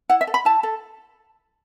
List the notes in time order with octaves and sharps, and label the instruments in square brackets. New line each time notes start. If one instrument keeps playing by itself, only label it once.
[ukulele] E4 F#5
E5
A4
B5
E4 A5
A4